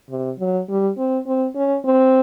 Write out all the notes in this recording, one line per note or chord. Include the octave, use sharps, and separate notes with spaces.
C3
F#3
G3
C4
C4
C#4
C4